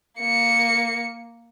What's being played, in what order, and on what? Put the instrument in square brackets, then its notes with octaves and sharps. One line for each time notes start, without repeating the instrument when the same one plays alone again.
[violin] A#3 C#7